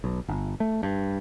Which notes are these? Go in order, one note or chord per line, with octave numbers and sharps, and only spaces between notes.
B1
G1
A3
G2